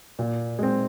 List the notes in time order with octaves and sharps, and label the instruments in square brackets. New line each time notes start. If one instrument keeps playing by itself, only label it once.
[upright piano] A#2
G#3 C4